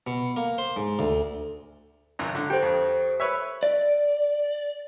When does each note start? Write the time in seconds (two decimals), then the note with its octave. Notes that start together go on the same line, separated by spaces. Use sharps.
0.07 B2
0.37 A#3
0.58 C5
0.77 G#2
0.99 D2
2.19 G#1 C#2 F#2
2.35 D3
2.50 G4 A4 C5 G5
2.62 F2
3.20 B4 C#5 E5
3.63 D5